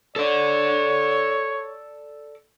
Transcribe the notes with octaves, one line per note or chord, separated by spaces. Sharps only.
A4 C#5 D5